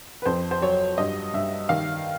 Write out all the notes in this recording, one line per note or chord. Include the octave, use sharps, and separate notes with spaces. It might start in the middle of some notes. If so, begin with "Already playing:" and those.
B4
F2 C5
C5
F#3 C#5
G2 D#5
G2 E5
D#3 F5